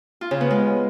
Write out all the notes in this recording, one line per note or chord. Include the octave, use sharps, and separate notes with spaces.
F4
C#3
B3
G#3